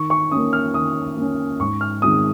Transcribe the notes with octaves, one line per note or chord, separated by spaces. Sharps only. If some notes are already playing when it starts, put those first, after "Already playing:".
Already playing: D#3 C#6
C#6
A#3 C#4 D#6
F6
D#3 D#6
A#3 C#4
G#2 C#6
F6
D#3 G#3 C4 D#6